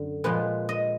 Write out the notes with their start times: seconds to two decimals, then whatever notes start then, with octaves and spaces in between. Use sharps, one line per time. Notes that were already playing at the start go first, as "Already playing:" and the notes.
Already playing: F#2 D3
0.24 A#2 F3 G#3 B4
0.69 D#5